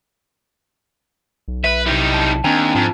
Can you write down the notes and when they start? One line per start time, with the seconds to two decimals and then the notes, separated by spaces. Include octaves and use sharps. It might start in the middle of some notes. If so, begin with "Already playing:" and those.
1.48 B1
1.64 B4 E5
1.86 C3 G3 D#4 E4
2.14 A5
2.44 D#2 C4 D4 G5 G#5 A#5
2.75 F2 G#2 F4 A5